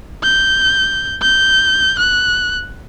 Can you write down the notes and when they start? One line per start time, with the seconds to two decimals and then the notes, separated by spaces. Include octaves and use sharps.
0.23 G6
1.22 G6
1.98 F#6